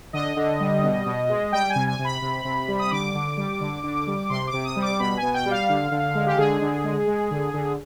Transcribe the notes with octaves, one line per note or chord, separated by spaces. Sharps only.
D3 D#5
D3
G3
B2
B2
G#3
G3 G5
G#5
C3
G#5
C3
B5
C3
C3
G3
D#6
D3 D6
D3
G3
D3
D3
G3
C3 C6
D6
C3
D#6
G3
D6
B2 B5
G#5
B2
G5
G3
F5
D3
D3
G#3
G4
D3 G#4
D3
G#3
G#3
D3
D3